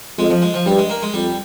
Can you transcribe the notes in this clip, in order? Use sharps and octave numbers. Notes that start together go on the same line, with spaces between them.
F2 G#3
F3
G#3
F3
G2 G3
G#3
A#3
G#3
F2 G3